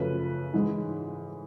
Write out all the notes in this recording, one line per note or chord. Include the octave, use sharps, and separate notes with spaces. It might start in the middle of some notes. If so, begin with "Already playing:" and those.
Already playing: F#2 C#3 F3 A3 B4
G#2 E3 G#3